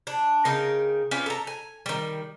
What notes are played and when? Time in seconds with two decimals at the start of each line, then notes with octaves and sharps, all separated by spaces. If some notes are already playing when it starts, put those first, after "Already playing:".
0.07 D4
0.45 C#3 D#4 A#4 G5
1.11 C#4 F4 G4 B4
1.26 A4 A#5
1.47 G#5
1.86 D#3 G3